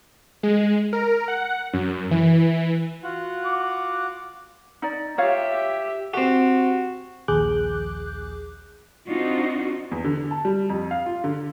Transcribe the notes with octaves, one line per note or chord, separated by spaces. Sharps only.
G#3
A#4
F#5
F#2
E3
F4 F#4 F#5
D6
D#4 D5
F4 G4 C#5 E5 F5
C4 F#4 G4
A#1 D#2 G#4 D6 F#6 G6
C4 D4 D#4 F4 F#4
E2
D3
A5
G3
F2
F5
F4
D3